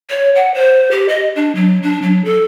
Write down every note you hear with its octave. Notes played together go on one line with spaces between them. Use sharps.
C#5
F#5
C5
G4
D#5
D4
F#3
D4
F#3
A4